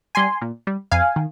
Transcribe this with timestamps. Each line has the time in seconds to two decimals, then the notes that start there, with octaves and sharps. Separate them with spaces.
0.15 G3 G#5 C6
0.41 A#2
0.67 G3
0.91 F2 F5 G#5
1.16 D#3